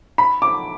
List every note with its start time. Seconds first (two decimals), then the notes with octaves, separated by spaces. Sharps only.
0.18 B5
0.42 D6